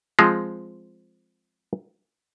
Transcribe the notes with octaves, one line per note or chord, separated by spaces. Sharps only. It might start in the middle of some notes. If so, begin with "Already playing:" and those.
F3 G#3 C4